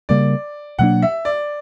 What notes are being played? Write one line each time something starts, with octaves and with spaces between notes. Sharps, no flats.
C#3 G3 A#3 D5
B2 F#3 A#3 D4 F#5
E5
D5